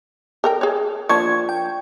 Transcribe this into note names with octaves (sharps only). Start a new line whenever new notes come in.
A4 A#4 G5
G#4 C#5
F3 A#3 D4 C#6 G#6
G5